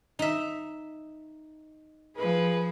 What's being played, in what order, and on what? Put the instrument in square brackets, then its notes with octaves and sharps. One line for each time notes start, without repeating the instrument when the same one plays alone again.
[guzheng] D#4 E5
[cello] F3 G#4 [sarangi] B4